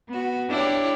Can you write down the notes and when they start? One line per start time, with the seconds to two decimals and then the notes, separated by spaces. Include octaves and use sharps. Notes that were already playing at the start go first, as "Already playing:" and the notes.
0.10 B3 F#4
0.50 D4 E4 G4 C#5